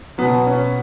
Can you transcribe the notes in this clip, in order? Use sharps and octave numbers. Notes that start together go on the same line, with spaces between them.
B2 F#3 B3
C#4